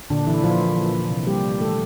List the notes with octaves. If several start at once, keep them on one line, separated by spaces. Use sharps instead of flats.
A#2 D3 D4
A#2 E3 E4
A#2 F3 F4
A#3
A#3
F3
C3
G3 A#3 G4
A#3
E3 A3 A4